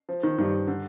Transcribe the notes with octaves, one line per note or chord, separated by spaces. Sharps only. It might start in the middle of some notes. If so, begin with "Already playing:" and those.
F3
D#3
G2 D#3
D3